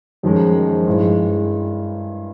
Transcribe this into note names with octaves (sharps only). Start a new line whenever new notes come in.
F#2 D#3 F3 G#3
G2 E3 G#3